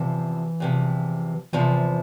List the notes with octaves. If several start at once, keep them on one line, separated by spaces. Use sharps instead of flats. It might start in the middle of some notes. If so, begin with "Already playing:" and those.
Already playing: E2 C3 E3 F3
E2 C3 F3
E2 C3 E3 F3